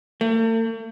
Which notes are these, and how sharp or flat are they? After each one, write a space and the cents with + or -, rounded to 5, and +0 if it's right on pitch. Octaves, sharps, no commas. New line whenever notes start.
A3 +45